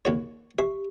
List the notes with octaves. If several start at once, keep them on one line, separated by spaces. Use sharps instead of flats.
D#2 F#4 C#5
G4 E5